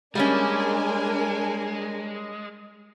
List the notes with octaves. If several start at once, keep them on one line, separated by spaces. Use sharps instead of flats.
G3 G#3 A#3 C#4 D4 A#4 G#5